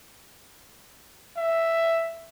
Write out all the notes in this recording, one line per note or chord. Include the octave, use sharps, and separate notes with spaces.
E5